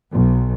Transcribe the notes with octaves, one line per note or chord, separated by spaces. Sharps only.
B1